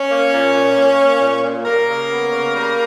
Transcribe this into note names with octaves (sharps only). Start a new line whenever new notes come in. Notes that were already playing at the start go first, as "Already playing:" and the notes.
Already playing: C#4
A#3
A#2
A#2
A#3
A#3
A#2
A#2
G3 A#3 A#4
C#3
B3
C#3
G3